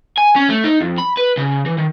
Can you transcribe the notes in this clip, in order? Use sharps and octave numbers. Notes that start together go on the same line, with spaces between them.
G#5
C#4
A3
D#4
F2
B5
B4
C#3
E3
D#3